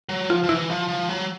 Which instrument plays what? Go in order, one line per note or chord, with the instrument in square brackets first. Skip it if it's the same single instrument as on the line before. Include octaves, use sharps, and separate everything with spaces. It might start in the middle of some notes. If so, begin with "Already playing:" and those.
[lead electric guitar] F#3
[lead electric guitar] F3 [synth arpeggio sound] F4
[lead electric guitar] F3
[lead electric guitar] E3 [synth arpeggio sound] E4
[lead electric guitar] F3
F3
F#3